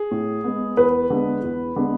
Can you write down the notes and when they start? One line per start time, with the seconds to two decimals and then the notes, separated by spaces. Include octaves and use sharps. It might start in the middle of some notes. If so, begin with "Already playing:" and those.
Already playing: G#4
0.11 A2
0.44 G#3 B3
0.77 E2 B4
1.10 D3 G#3 B3
1.43 E2
1.76 D3 G#3 B3